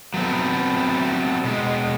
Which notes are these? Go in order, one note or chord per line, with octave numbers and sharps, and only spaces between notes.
F#3 A3 B3 C4
B2 G#3